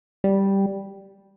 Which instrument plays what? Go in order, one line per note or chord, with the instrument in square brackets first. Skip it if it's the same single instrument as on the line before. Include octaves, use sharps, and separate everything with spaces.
[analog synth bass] G3